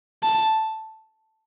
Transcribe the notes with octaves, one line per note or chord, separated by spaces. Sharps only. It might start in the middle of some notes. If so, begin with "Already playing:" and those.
A5